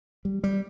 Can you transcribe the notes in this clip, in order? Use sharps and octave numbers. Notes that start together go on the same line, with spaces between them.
G3
G3